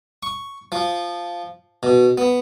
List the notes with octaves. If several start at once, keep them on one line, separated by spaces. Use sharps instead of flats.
C#6
F3
B2
B3